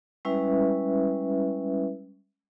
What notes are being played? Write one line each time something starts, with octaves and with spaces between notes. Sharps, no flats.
G3 G#3 C#4 E4 B4 E5